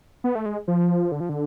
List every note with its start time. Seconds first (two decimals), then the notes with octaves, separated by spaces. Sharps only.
0.24 B3
0.35 A3
0.46 G#3
0.68 F3
1.12 D3
1.20 F3
1.29 D3